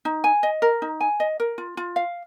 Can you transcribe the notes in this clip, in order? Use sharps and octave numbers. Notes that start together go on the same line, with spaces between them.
D#4
G#5
D#5
A#4
D#4
G#5
D#5
A#4
F4
F4
F5